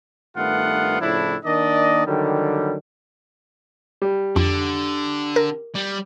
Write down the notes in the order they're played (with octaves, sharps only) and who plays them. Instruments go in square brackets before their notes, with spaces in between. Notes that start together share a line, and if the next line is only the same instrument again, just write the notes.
[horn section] G2 D#3 A3 B3 F4 F#5
A2 C#3 F3 D4 E4
D#3 A#3 D4 D5 D#5
D3 D#3 F#3 G3
[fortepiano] G3
[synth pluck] F2 [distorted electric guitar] D3
[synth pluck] A#4
[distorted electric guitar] G3